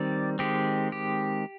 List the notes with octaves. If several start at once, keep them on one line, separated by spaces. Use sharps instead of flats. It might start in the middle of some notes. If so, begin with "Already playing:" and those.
Already playing: D#3 G3 C4 D5
D#3 G#3 C4 G4
G4